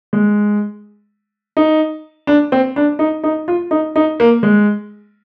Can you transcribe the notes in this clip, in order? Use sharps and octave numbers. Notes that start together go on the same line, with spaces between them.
G#3
D#4
D4
C4
D4
D#4
D#4
F4
D#4
D#4
A#3
G#3